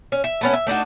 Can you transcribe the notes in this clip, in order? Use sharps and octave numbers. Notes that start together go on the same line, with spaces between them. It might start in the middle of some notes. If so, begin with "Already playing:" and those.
C#4
E5
A3 B3 C#4
E5
A3 D4 D#4 F#4